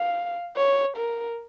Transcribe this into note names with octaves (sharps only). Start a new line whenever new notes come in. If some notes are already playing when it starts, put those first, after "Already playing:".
Already playing: F5
C#5
A#4